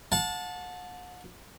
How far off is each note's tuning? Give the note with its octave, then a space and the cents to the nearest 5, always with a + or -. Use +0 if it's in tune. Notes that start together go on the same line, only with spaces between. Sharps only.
F#5 -40 A5 -10